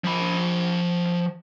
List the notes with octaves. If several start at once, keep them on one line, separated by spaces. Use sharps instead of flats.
F3 B5